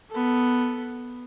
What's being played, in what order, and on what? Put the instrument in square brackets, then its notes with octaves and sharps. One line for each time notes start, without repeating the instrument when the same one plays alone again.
[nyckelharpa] B3 A4